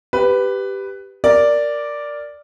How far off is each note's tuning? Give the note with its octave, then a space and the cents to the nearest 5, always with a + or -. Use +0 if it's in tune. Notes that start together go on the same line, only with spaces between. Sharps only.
G4 +0 B4 +10
A#4 +0 D5 +0